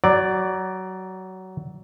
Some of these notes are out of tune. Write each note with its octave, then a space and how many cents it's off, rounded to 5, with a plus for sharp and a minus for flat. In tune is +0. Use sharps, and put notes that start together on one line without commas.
F#3 +20 D5 +0